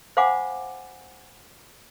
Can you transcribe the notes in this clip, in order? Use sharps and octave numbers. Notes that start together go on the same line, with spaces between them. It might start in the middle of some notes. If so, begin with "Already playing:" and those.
C5 F5 F#5 G#5 B5 D6